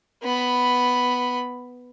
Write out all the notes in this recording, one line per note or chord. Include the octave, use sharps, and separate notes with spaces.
B3 B5